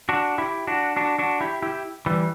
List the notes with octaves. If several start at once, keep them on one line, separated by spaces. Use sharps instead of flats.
D4 F#4
E4 G4
D4 F#4
D4 F#4
D4 F#4
E4 G4
E4 G4
E3 G3